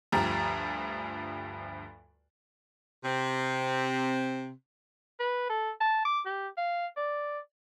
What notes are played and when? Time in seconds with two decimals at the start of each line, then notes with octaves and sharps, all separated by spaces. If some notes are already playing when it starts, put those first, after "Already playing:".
0.12 D2 G2 F3 G4 A#5
3.04 C3 C4
5.20 B4
5.50 A4
5.81 A5
6.05 D6
6.26 G4
6.57 F5
6.97 D5